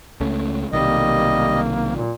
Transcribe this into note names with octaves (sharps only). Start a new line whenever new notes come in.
C#2 A3 C#4
B1 C3 D#3 G3 A#3 D#5
A#2